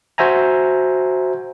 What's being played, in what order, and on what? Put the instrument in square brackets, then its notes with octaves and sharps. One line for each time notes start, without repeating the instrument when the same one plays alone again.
[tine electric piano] F#4 C5 E5 G#5 A#5